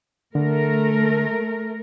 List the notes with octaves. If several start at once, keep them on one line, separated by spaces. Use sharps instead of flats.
D3 A3 A#4